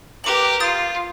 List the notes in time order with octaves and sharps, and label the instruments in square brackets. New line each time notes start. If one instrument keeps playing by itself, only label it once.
[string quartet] G4 A#4 [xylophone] B4 D6 F#7
[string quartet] F4 [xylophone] D#6 G6 A6